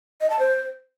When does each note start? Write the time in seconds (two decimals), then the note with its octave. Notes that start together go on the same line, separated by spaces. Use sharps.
0.21 D#5
0.30 A5
0.39 C5